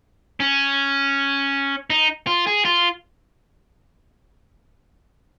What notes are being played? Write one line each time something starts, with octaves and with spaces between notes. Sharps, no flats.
C#4
D#4
F4
G#4
F4